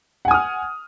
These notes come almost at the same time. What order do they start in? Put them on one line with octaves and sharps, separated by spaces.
F#5 G#5 D#6 F6